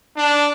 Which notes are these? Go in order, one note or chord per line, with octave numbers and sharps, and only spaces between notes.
D4